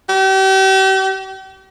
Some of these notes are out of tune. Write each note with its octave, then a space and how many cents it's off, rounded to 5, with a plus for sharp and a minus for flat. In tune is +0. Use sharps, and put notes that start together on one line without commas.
G4 -40